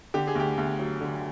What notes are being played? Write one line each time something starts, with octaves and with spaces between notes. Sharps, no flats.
D3 G4
G#4
D2 G4
D2
F#3
D3